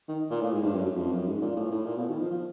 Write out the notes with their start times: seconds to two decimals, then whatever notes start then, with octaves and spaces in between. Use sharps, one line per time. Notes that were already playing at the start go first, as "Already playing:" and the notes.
0.08 D#3
0.30 A#2
0.41 A2
0.53 G#2
0.63 G2
0.75 F#2
0.86 F#2
0.97 F2
1.12 F#2
1.27 G#2
1.41 A#2
1.56 A2
1.71 A2
1.86 A#2
1.97 B2
2.09 D#3
2.19 F3
2.30 F3